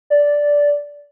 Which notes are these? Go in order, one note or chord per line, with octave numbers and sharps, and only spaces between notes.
D5